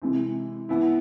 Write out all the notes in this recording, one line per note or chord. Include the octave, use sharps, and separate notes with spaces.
C3 E3 G#3
E3 B3 E4